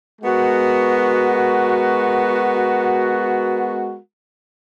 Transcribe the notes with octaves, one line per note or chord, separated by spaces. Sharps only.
G#3 B3 F#4 A#4